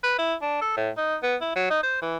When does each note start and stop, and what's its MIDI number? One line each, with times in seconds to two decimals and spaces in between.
0.04 0.16 71
0.19 0.35 64
0.42 0.58 62
0.62 0.74 69
0.77 0.90 45
0.98 1.16 63
1.23 1.36 59
1.42 1.53 64
1.56 1.70 54
1.70 1.82 63
1.83 1.98 72
2.02 2.17 52